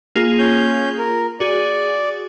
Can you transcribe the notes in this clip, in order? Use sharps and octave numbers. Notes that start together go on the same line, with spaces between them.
A#3 F4 G#4
C#4 G6
A#4
F#4 G#4 D5